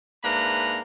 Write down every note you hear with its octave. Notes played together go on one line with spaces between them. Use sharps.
G#2 A#3 D4 B4 E5 A#5